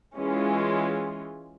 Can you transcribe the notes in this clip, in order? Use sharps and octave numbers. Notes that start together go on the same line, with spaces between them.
E3 G#3 C#4 F4